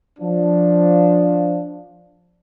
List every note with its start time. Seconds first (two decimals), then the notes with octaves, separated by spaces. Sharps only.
0.19 F3 D4